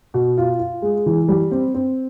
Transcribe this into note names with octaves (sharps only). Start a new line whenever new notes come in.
B2
F4
F4
G#3
E3
G3
C4
C4